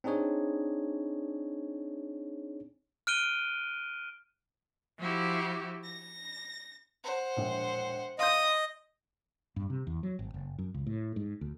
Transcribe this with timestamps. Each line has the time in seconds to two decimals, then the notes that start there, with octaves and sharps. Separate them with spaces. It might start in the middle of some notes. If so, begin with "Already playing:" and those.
0.04 C4 D4 D#4 G#4 C#5
3.07 F6 F#6 D7 D#7 G7
4.99 F3 E4 F#4 G4
5.84 A#6
7.04 C5 F#5
7.37 E1 A#1
8.19 D#5 F5 C6 D#6 G6
9.56 G2
9.70 C3
9.87 E2
10.03 F#3
10.19 G#1
10.34 F#1
10.58 F#2
10.74 C#2
10.86 A2
11.16 G#2
11.41 D2